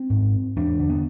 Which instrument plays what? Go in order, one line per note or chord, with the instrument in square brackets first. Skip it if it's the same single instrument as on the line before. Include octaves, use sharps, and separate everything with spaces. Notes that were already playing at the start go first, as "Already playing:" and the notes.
Already playing: [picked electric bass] C4
G#2
E2 D4
D3
B3